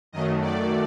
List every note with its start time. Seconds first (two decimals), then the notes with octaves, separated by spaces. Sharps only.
0.12 F#2 D#3 F#3 A3 D#5
0.41 D5